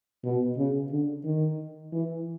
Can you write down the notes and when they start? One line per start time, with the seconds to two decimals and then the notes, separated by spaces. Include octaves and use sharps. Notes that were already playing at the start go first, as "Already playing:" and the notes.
0.24 B2
0.58 C#3
0.92 D3
1.25 D#3
1.92 E3